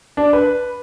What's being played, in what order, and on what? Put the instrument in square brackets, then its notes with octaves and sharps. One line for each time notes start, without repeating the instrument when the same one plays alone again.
[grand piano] D4
B4